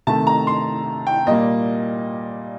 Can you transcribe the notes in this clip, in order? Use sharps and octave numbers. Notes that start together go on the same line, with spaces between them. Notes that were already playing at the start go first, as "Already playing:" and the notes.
C3 D#3 A3 A5
A#5
C6
G5
A#2 G3 A#3 D#5